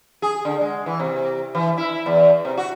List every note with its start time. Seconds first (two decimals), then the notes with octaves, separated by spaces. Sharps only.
0.22 G#4
0.45 D3
0.61 G#3
0.86 E3
1.00 C3
1.55 E3
1.78 E4
2.06 E2
2.45 C3
2.57 F#4